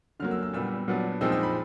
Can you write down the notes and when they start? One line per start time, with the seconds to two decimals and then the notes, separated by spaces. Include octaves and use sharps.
0.20 D3 F#3 A#3 F6
0.31 E6
0.43 E6
0.53 A#2 G3 B3 E6
0.88 A#2 F#3 B3 D4
1.21 A#2 F3 G#3 C4 D#4 E6
1.32 E6
1.43 B5